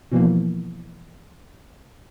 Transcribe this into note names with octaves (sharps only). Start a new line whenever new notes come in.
B2 E3 F3 A#3